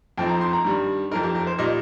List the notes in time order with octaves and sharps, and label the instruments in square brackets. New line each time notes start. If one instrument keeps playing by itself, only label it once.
[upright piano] F2 F3 C4 D#4 G5
A#5
C6
A#5
G2 D#3 G3
F2 F3 D#4 A#4
G4
A#4
C5
A#2 G3 D#4 D#5